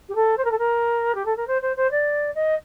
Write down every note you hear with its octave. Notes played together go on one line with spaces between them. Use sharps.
G4
A4
C5
A#4
A4
A#4
G4
A4
A#4
C5
C5
C5
D5
D#5